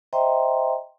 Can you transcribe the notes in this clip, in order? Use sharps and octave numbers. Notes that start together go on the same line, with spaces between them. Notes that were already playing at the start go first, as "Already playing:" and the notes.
C5 D#5 E5 G5 A#5 C6